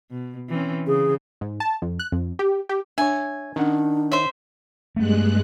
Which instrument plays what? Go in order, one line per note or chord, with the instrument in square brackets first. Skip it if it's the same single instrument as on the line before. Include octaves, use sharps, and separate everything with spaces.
[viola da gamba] B2
E3 C4 C#4
[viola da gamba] C#3 [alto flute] G#4
[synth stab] G#2
A5
F2
F#6
F2
G4
G4
[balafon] D4 [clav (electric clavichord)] C#5 E5 [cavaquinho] G#5
[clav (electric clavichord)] D#3 F#5 [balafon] C#4 [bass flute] D4
[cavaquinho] C5 E5 [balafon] C#5
[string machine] G2 G#3 F#6 [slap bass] A3 B3